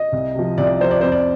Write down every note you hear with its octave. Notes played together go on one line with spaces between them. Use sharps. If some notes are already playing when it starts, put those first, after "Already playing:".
Already playing: D#5
C2
C3 F3
C2 D5
C3 F3 C5
D5
F2 C5
D5